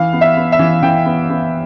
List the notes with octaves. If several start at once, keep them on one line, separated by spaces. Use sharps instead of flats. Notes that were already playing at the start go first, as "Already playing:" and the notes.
Already playing: E3 F5
B3
E5
B3
E5
E3
E3 G5
B3
B3